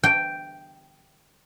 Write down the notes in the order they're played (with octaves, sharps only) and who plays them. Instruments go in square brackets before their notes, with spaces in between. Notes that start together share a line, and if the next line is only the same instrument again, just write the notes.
[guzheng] G5